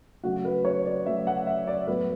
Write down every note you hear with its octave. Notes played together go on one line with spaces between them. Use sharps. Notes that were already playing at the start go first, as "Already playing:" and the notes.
C#3 F#3 A3 F#4
B4
C#5
D5
C#3 F#3 A3 E5
F#5
E5
D5
A2 F#3 B3 B4